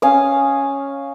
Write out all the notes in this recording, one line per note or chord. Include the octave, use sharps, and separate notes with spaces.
C#4 F5 D#6